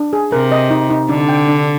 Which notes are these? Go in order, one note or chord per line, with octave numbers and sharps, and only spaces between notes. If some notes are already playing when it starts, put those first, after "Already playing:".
Already playing: D4
G#4
C3 A#4
D#5
D#4
D#4
D3 D4
G5
D4